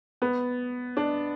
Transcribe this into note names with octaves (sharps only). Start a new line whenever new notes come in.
B3
D4